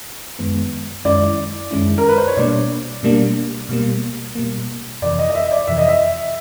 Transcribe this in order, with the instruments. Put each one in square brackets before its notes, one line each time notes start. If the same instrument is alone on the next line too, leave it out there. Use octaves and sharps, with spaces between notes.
[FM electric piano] F#2 D#3 G#3 B3
[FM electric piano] F#2 D#3 G#3 C#4 E4 [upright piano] D5
[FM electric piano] F#2 D#3 G#3 C#4 E4
[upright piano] A#4
B4
C5
C#5
[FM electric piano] B2 G3 A#3 D4 [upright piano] D5
[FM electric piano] B2 G3 A#3 D4
B2 G3 A#3
B2 G3 A#3
[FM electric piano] F2 C3 E3 [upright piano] D5
[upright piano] D#5
D#5
E5
D5
[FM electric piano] F2 C3 E3 [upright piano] E5
[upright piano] D#5
E5